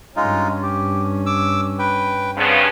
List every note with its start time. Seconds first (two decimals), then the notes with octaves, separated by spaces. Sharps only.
0.16 G2 G#3 C#4 D#4 F4
0.63 G4
1.26 D6 E6
1.79 B4 G5
2.37 G2 C#3 B3 C4